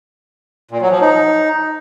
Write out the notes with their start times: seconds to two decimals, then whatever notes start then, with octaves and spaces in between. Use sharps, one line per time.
0.71 A#2
0.81 F#3
0.91 F3
1.01 D#4